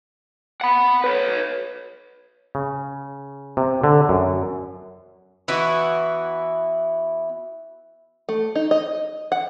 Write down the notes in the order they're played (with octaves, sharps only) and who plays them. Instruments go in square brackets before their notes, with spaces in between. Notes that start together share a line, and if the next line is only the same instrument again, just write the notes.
[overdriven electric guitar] F#5 B5
B4 C#5
[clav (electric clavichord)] C#3
C3
D3
F#2
[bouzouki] E3 B3 E4 F#4
[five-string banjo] A3
D#4
D#5
F#5